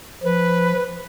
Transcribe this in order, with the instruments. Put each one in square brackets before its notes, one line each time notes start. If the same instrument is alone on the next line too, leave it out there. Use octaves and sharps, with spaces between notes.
[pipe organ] F3 [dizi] B4